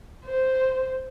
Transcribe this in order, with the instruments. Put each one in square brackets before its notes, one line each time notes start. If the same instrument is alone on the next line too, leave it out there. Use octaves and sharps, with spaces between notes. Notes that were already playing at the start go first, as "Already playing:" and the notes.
[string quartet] C5